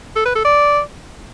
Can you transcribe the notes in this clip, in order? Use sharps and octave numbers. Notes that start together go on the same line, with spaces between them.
A4
B4
A4
D5